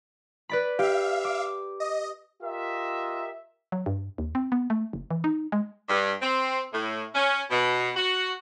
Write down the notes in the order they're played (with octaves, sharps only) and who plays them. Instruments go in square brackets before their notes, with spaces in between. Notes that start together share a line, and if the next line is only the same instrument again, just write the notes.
[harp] B4 D5 B5
[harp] G4 [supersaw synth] E5 F5
[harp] D6
[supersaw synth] D#5
[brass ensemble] F4 G4 A#4 D#5 E5
[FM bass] F#3
G2
D#2
C4
B3
A3
F#1
E3
D#4
G#3
[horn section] G2
C4
A2
C#4
B2
F#4